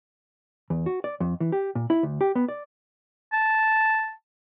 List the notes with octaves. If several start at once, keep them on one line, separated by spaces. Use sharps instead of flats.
E2
F#4
D5
F2
E3
G4
A#2
E4
D2
G4
B3
D5
A5